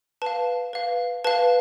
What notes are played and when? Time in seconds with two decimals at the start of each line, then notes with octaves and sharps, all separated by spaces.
0.22 B4 F5 A5
0.73 B4 F5
1.24 B4 F5 A5